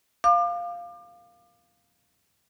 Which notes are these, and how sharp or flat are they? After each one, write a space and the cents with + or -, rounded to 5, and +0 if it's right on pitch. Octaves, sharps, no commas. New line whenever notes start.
F5 +0 D6 +35